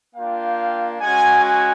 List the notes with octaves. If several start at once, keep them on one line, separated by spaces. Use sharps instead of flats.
A#3 D4 F4 F5 G5
G#3 C#4 F#4 F#5 G#5
F#5 G#5